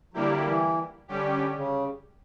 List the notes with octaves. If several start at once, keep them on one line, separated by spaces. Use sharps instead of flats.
D3 F#3 G3 A#3 E4 G4
F#3
E3
D3 G3 C#4 G4
C#3